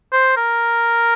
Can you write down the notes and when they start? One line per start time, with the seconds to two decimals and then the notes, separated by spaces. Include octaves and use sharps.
0.12 C5
0.37 A#4